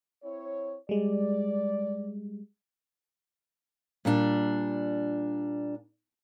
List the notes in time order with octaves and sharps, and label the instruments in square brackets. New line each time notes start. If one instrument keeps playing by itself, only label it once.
[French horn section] C4 E4 C#5
[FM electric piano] G3 G#3 [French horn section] D5
[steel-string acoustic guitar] A#2 G3 D4